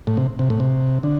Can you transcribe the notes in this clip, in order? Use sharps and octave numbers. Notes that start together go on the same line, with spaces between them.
A2
C3
C3
A2
C3
D3